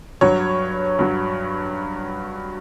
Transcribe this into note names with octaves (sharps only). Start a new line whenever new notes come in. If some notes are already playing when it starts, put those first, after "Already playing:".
G2 F#3 C#5
G2 F#3